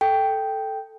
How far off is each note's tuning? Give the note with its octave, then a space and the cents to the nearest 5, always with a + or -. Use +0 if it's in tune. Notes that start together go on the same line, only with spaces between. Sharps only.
A4 +0 G5 +0